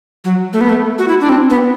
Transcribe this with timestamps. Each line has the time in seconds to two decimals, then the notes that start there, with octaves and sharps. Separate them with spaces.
0.24 F#3
0.53 A3
0.61 B3
0.69 A3
0.99 F#4
1.08 E4
1.21 D4
1.29 C4
1.50 B3